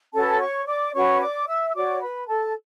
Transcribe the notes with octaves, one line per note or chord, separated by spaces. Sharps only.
C#4 F#4 A4 B4 A5
C#5 C#6
D5 D6
C#4 F#4 B4 C#5 C#6
D5 D6
E5 E6
E6
F#4 C#5 D5 D6
B4 B5
A4 A5